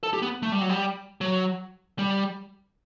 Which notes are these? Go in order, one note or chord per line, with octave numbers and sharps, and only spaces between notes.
A4
G4
B3
A3
G3
F#3
G3
F#3
G3